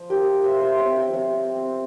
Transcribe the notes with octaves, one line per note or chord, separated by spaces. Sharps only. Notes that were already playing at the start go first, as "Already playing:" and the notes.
Already playing: F3
G4 A#4
F4
F4
C5 E5
F4 C5 E5
C#5 F5
C4
E5 G5
F3
C#5 F5
C4
C4